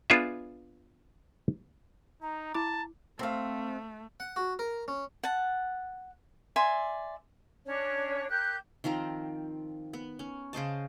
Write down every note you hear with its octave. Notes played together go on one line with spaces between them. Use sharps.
B3 D4 F4 G#4 D5 E5
D#4 A#5
E4 A5 D6
A3 C4 F5
F#5
F#4
A#4
C#4
F#5 A5
D5 E5 G#5 C6
C#4 D4 C#5
G4 A#4 F#6 G6
D#3 F3 C4 A#5
B3
C#4
C#3 C5 D#5 A5